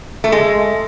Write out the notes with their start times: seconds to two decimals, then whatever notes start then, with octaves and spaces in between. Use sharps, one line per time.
0.24 A3
0.32 G#3